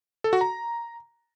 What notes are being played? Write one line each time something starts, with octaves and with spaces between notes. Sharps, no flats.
A4
F#4
A#5